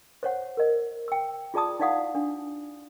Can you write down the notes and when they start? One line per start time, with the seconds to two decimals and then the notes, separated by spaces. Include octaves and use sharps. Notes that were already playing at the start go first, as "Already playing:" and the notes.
0.23 C5 C#5 F#5
0.57 A#4 D#5
1.08 G5 E6
1.54 F4 G#4 D5 A5 D#6
1.80 D#4 E4 D5 F5 F#5 D#6
2.15 D4